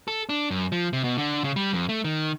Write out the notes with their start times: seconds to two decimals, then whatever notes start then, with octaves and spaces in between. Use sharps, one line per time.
0.08 A4
0.29 D4
0.50 F#2
0.72 F3
0.93 C3
1.04 B2
1.18 D3
1.44 C#3
1.56 G3
1.73 F2
1.89 A3
2.04 D#3